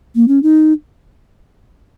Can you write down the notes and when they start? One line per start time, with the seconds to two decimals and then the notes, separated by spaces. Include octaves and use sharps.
0.15 A#3
0.28 C#4
0.43 D#4